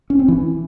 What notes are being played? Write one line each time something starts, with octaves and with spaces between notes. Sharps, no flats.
C#4
C4
E3